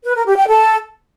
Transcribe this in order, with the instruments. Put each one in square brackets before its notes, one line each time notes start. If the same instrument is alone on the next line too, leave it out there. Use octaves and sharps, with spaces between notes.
[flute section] B4
A#4
G4
G5
A4